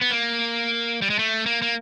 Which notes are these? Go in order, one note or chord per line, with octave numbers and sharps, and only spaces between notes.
B3
A#3
G3
G#3
A3
A#3
A#3